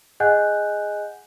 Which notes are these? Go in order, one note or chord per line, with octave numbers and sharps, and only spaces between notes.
G#4 D#5 F#5 G#5 F#6 G6